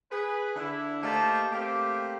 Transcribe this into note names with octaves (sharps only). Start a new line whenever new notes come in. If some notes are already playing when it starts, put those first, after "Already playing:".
G#4 B4
D3 D4 E4
A3 A#3 D#4 G4 C5 A5
A3 A#3 C4 G4